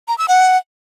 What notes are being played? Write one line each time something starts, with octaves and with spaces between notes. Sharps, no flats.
A#5
E6
F#5